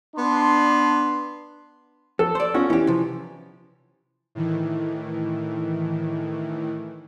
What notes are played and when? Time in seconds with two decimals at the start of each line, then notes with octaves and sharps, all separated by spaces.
0.16 B3 D4 C6
2.19 F2 A4
2.35 C5 D5
2.54 C#4 F4 F#4
2.70 E3 C#4 G4
2.87 C3 F3
4.35 A2 D#3 E3